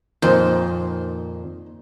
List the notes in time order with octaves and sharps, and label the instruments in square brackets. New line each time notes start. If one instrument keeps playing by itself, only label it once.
[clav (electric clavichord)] F2 A#2 D#3 [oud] C5